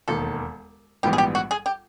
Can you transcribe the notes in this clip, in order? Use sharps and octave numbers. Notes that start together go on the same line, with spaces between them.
E1 D#2 D#3 A4
A#1 G#2 E3 G3 B3 G4
G#4
G4
F#4
G#4
G4